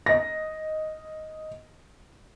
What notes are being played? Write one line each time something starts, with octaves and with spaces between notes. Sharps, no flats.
D#5 A#6